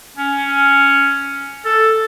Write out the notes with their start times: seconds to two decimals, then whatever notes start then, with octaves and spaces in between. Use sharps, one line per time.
0.17 C#4
1.65 A4